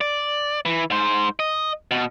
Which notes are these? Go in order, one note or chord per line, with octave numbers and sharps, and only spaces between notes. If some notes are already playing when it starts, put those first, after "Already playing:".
D5
E3
G#2 C5
D#5
B2